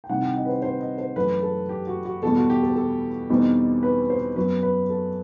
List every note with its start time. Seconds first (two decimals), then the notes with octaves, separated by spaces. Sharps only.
0.04 G5
0.09 C2 C3 D#3 G3 F#5
0.22 G5
0.36 D#5
0.45 B4
0.49 C5
0.62 C5
0.81 D#5
0.98 C5
1.16 F#2 E3 A3 B4
1.43 A4
1.69 G4
1.87 F#4
2.05 F#4
2.22 E2 B2 G3 A4
2.36 F#4
2.50 G4
2.63 A4
2.76 A4
3.29 E2 B2 G3 C4 D#4
3.83 B4
4.10 C5
4.36 F#2 F#3 B3 B4
4.63 B4
4.89 A4